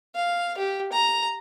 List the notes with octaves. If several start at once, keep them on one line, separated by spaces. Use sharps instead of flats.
F5
G4
A#5